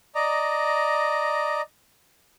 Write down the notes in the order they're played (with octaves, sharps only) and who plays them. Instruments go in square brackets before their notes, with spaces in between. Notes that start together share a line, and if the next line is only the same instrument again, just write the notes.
[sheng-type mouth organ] D5 D#5 A#5